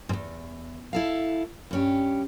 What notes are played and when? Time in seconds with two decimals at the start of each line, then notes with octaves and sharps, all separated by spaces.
0.09 E2 G#2
0.93 E4 A4 F5
1.71 G2 C#4 G4